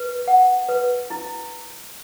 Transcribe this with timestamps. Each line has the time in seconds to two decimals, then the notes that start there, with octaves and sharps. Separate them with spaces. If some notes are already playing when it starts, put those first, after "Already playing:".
Already playing: B4
0.28 F#5
0.69 B4
1.10 E4